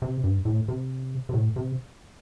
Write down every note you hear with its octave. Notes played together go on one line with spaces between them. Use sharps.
C3
G2
A2
C3
C3
A2
C3